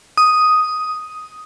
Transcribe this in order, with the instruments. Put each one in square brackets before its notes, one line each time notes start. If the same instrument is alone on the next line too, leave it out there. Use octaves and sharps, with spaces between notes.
[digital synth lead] D#6